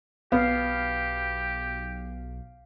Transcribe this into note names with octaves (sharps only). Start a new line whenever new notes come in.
B1 B3 G4 F5